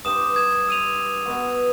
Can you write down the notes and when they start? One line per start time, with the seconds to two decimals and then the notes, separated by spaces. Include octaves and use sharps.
0.05 G2 G4 C5 D#6 E7
0.34 D#6 G#6 E7
0.69 E6 D#7 F7
1.25 B2 B3 F#4